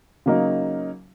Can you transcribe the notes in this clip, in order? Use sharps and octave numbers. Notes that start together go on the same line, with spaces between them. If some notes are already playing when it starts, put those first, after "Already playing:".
C#3 F#3 A#3 D#4